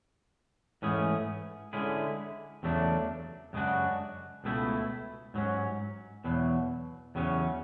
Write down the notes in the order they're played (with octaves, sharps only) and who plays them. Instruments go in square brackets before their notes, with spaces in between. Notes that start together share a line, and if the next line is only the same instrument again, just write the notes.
[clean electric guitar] G#2 E3 A3 C#4 G#4
D3 G#3 C#4 E4 G#4
E2 C#3 F#3 A3 D4
F#2 C#3 G#3 D4 F#4
C#2 B2 A3 E4
G#2 F#3 C#4
E2 B2 F#3
E2 C#3 F#3 C#4